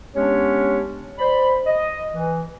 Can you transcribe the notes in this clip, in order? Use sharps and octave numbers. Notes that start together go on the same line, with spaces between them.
G#3 B3 C#4 D4 G4 C#5
C5 D5 B5
D#5
E3